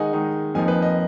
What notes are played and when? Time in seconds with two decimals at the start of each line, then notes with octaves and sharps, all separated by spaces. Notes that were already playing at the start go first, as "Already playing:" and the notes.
Already playing: D#3 G#3 D#4 F#5 G#5
0.13 D#3 G#3 D#4
0.54 F2 F3 A#3 D#4 G#5
0.68 B4
0.82 D#5